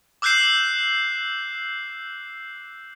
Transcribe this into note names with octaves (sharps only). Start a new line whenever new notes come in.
D6 E6 F#6 G6 C7 E7